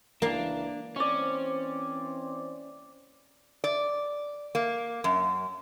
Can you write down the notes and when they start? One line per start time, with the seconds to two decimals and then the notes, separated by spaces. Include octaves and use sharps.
0.22 C#2 E3 A#3 D4
0.96 E3 C4 C#4 C5 D5 C#6
3.64 D5
4.55 A#3
5.04 F#2